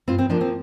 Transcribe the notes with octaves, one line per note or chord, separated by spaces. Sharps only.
G2 C4 F4
C4
F3 A#3 D4
C4